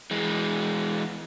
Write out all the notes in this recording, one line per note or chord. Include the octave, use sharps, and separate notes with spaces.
E3 G#3